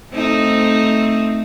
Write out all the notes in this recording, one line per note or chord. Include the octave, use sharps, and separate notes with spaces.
A3 C4 D#4